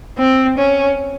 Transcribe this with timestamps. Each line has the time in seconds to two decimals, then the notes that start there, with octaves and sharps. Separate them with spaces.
0.18 C4
0.58 C#4